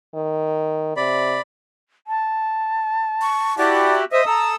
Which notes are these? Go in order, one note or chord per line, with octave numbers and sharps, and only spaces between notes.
D#3
C3 D5 B5
A5
C#6
E4 F#4 G4 D5
C5 D#5 E5 D#6
A4 A#5 E6